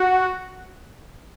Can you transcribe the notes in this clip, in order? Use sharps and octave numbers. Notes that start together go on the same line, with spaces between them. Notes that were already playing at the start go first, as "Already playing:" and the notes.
Already playing: F#4